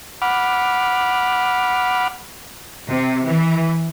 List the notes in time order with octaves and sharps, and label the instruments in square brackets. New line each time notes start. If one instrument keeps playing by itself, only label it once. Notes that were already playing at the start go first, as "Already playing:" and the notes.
[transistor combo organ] F#5 B5 D6 F6
[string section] C3
E3